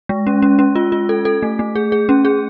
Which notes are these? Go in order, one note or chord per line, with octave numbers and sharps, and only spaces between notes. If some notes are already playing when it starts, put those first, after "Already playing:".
G#3
C#4
C#4
C#4
F4
F4
A4
A4
A3
A3
G#4
G#4
C#4
G#4